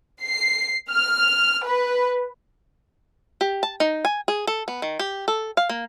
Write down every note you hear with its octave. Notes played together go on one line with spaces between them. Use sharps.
C7
F6
B4
G4
A5
D#4
G#5
G#4
A4
B3
D#3
G4
A4
F5
A#3